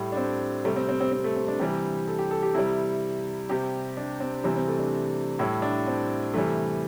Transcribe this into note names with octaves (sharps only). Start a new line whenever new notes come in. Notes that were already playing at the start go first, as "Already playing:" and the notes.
Already playing: A2 G3 A3
D4
C4
C3 G3 A3
C4
C4
C4
C4
A3
C4
D4
C3 E3 G3 G4
A4
G4
A4
G4
C3 G3 E4
C3 G3 G4
D4
C4
C3 E3 G3 C4
C4
A3
D4
A2 G3 E4
D4
C4
C3 E3 G3 A3